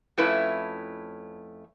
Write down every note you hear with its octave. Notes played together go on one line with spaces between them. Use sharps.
F2 A3 C#4 E4 B4